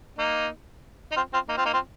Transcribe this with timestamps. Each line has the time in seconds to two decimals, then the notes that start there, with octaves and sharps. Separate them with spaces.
0.19 A#3 D#4
1.12 D#4
1.16 C4 F4
1.33 C4 F4
1.49 A#3 D#4
1.57 C4 F4
1.66 A#3 D#4
1.74 C4 F4